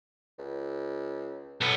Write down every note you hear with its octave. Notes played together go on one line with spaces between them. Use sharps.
C#2
B1 B3 A4